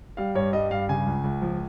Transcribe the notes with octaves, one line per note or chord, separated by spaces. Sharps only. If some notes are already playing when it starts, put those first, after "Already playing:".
G3 F5
G2 C#5
G3 D#5
G2 F5
C#3 G#5
C#2
C#2
F3